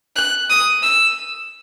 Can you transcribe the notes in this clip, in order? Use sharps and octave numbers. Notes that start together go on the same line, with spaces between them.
F#6
D#6
E6